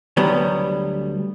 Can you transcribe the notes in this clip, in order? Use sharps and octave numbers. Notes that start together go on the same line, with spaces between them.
D2 F#3 G3 B3